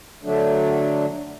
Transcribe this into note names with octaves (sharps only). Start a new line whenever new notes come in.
D3 F#3 A3 D4